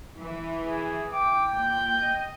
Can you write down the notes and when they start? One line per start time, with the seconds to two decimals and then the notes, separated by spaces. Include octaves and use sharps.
0.18 E3
0.66 G#4
1.12 G5 D6
1.54 A#2 G6
2.00 D#5